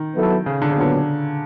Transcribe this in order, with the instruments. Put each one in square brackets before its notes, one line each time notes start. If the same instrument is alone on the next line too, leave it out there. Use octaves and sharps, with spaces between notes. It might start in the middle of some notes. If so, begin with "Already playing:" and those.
Already playing: [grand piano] D#3
[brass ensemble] F#3 B3 E4 A4
[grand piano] C#3
D3
C#3
[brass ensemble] A#2 F#3 B3 [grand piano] D3